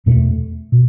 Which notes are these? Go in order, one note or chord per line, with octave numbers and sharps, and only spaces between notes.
E2 B2 A3
B2